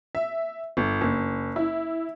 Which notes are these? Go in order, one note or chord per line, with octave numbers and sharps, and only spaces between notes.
E5
G1
F#1
E4